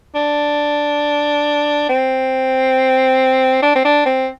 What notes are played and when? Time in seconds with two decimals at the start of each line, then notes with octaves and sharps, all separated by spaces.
0.15 D4
1.89 C4
3.62 D4
3.75 C4
3.85 D4
4.05 C4